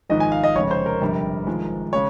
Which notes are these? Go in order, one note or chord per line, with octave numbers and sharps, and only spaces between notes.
G#1 G#2 F3 G#3 D#5
G#5
F5
D#5
F1 F2 C#3 G#3 C#5
C5
A#4
G1 F2 C3 G3
G#1 G#2 F3 G#3
C#3 G#3 C#5